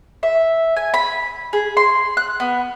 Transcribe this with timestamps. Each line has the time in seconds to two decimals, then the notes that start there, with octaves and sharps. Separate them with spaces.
0.23 E5
0.77 G#5
0.94 B5
1.53 G#4
1.77 C6
2.17 F#6
2.40 B3